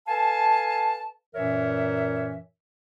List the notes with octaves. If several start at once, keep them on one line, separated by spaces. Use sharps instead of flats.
A4 B4 F5 G#5 A5
F#2 A#2 E3 A#4 C#5 E5